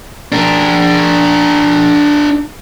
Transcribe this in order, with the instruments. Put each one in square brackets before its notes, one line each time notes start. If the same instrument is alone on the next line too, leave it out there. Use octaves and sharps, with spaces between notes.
[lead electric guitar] D4 A#4